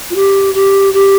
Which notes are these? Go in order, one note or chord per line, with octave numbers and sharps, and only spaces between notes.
F4
G4
G4
G4